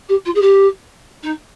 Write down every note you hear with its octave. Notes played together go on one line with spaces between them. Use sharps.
G4
F4
G#4
G4
D#4